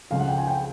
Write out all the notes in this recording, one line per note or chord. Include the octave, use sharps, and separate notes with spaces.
C#2 C#3 F3 F5
F#5
G5
G#5
G5